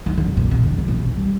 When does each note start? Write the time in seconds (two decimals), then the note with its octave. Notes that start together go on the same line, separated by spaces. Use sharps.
0.06 D#3
0.18 D3
0.28 C3
0.37 A#2
0.51 C3
0.64 D3
0.78 C3
0.88 A#2
0.98 C3
1.08 D#3
1.18 G3